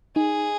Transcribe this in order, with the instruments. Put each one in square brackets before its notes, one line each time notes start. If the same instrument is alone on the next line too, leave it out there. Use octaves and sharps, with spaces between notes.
[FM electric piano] D#4 [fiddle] G#4